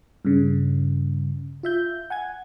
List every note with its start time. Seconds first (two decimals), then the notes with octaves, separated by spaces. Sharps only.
0.25 G2 C#3
1.63 F4 E5 G6
2.10 F#5 G#5 G#6